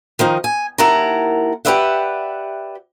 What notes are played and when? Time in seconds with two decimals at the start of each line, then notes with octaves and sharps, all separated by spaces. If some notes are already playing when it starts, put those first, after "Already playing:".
0.19 D#3 F3 D#4
0.44 G#5
0.78 D#2 E4 A#4 F#5 A5 A#5
1.65 G4 A#4 B4 D5 E5 F#5